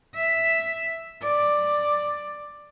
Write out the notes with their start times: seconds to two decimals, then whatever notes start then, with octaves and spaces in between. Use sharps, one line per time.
0.15 E5
1.22 D5